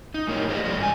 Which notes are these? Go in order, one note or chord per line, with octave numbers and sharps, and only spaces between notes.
D#4
F#2 A2 A#3 A#4 C#5 D#5
G4 G#4 A#4 C5 D5 D#5
F3 G3 A4 D5 D#5
G#2 G4 G#5